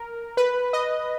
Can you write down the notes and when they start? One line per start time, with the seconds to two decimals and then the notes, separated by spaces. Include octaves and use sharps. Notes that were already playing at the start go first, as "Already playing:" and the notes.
Already playing: A#4
0.37 B4
0.73 D#5